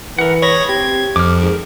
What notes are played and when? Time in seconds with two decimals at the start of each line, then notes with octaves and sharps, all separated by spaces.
0.19 E3 A#4 F#5
0.42 G#4 C#5 B5 A#6
0.69 C4 G4 G#6
1.16 F2 D6 F6
1.41 G#2 A#4